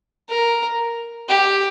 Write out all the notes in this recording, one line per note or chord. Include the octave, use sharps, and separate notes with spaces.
A#4
G4